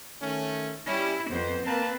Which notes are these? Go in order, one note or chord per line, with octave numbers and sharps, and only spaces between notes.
D#3 A3 C#4
G3 C#4 E4
F2 B3 C5
A#3 C4 A#4 B4 A5